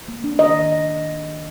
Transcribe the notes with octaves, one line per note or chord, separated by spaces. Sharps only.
A#3
D4
D#3 D#5
D#3